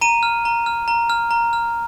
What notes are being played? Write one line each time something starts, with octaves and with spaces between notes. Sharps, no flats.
A#5 D#7
F6
A#5
F6
A#5
F6
A#5
F6